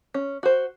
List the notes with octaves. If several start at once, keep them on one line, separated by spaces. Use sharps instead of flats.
C#4
F#4 C5